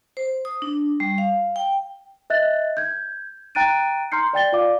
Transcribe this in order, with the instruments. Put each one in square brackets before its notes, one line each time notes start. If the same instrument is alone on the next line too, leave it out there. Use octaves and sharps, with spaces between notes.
[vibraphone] C5
D#6
D4
G3
F5
G5
[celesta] D#5 E5 F#6 A6
G6 G#6
G5 A#5 F#6 A6 D7 D#7
A#5 C6 F6 G6 C7 C#7
D5 G5 A6 G7
F4 D5 F5 D6